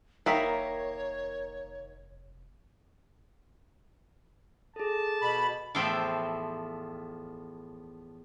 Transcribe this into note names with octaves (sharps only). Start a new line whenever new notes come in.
F1 D#3 A#3 C#5 E5 B5
G#4 A4 A5
B2 B5
E2 A2 F3 C5 E5 G5